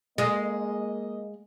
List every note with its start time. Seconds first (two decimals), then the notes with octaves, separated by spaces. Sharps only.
0.18 G#3 A#3 D#5